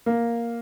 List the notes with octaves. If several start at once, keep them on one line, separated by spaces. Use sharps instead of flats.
A#3